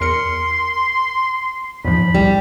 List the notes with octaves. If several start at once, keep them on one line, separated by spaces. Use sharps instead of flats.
E2 A#4 C6 C#7
E2 G#2 F3 B5
C2 G3